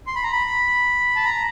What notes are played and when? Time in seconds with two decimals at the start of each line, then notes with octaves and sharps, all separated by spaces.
0.07 C6
0.16 B5
0.23 A#5
0.32 B5
1.16 A5
1.25 A#5